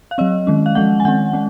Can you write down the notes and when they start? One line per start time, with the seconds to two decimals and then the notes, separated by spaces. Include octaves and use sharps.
0.11 F5
0.18 F#3 C4 D#5
0.47 D#3 G#3 C#4
0.66 F5
0.75 F3 G#3 C#4 F#5
1.00 G#5
1.05 D#3 G#3 C4 F#5
1.33 G#3 C#4